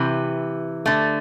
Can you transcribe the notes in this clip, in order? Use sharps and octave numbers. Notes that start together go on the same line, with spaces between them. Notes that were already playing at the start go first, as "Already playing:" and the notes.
Already playing: C3 E3
D3 A3